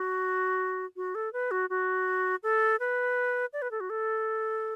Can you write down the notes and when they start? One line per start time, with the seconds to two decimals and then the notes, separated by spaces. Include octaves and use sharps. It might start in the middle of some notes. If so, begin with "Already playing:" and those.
Already playing: F#4
0.96 F#4
1.15 A4
1.33 B4
1.51 F#4
1.70 F#4
2.43 A4
2.80 B4
3.53 D5
3.62 B4
3.71 A4
3.80 F#4
3.90 A4